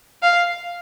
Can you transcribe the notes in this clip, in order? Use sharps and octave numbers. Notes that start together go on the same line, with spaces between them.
F5